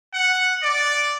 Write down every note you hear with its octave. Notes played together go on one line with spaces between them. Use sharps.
F#5
D5